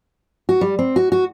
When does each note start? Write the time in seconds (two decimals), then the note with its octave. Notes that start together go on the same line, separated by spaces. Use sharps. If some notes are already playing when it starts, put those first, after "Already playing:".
0.49 F#4
0.61 G3
0.79 C4
0.96 F#4
1.12 F#4